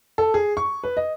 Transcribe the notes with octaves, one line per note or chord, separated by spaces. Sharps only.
A4
G#4
C#6
B4
D#5